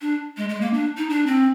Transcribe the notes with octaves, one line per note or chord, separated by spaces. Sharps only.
D4
G#3
G#3
A#3
D4
D#4
D4
C4